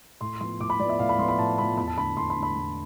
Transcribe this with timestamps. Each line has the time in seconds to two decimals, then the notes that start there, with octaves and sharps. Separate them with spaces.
0.21 A2 C6
0.41 F3 B3 C6
0.60 A2 D6
0.70 B5
0.80 F3 D5
0.84 B3
0.89 E5
0.99 A2 F5
1.09 B5
1.19 F3 C6
1.23 B3
1.28 B5
1.38 A2 A5
1.58 F3 B3 B5
1.77 E2 B5
1.87 A5
1.97 D3 A3 B5
2.17 E2 C6
2.30 B5
2.36 D3 A3
2.43 B5
2.56 E2